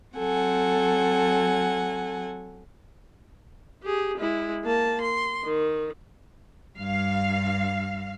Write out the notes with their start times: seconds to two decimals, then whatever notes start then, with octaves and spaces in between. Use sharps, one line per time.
0.16 F#3 C4 A4 F#5 G#5
3.83 G4 G#4
4.18 G#3 E4
4.64 A#3 A5
5.01 C6
5.44 D#3
6.77 G2 F5